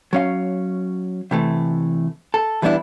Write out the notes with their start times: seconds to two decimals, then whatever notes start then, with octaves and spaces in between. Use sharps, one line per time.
0.13 F#3 C#4 F5
1.31 C3 E3 A3
2.34 A4
2.62 E3 G3 B3 D4 E4